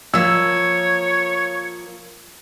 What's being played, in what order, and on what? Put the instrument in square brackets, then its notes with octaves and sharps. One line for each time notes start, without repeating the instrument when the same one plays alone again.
[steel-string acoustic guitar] F3 A#3 [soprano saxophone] C#5 [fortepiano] E6